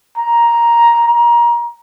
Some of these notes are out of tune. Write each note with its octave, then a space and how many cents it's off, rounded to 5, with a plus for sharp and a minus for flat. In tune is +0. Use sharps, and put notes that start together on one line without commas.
A#5 +10
A#5 +25